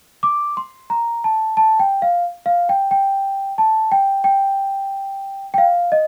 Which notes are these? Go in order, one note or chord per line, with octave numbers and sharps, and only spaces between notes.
D6
C6
A#5
A5
A5
G5
F5
F5
G5
G5
A5
G5
G5
G5
F5
D#5